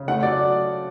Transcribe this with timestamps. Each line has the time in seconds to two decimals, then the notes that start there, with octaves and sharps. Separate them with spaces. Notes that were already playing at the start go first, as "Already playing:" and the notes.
Already playing: C#3
0.08 A3 F#5
0.23 F#3 D5